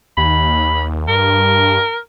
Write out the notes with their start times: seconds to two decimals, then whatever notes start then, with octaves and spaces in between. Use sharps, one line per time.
0.17 D#2 B5
1.08 G2 A#4